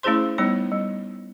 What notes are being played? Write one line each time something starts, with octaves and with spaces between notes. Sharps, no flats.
A3 C#4 E4 G#4 C5 C6
G3 B3 D#4 C#5
G3